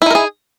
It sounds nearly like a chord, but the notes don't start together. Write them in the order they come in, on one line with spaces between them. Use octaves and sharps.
E4 D#4 A#4 G#4